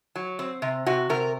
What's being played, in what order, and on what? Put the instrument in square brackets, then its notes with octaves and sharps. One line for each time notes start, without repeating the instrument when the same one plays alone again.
[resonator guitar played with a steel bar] F#3
C4
C3
C3 F#4
C3 A#4